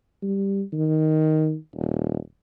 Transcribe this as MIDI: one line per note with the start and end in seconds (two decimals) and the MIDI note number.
0.22 0.63 55
0.73 1.56 51
1.75 2.17 27